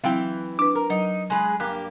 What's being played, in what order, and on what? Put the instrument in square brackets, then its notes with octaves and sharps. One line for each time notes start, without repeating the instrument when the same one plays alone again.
[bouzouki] E3 [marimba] F#3 C4 E4 [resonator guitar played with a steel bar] F5 G5
[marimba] D4 B4 [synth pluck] D6
[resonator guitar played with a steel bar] A#4
[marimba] F#3 [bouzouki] D#4
[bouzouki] G#3 G#4 B4
[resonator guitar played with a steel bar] G2 A#3 [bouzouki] G4 [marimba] F#6